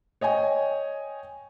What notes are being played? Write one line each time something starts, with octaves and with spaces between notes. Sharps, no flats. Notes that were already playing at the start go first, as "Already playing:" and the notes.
C#5 D#5 G5 G#5